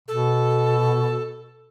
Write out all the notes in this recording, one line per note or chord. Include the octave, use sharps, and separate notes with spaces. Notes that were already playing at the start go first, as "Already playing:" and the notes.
B2 A4